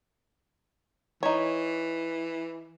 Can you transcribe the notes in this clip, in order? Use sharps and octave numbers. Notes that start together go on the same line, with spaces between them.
E3 D#4 C#5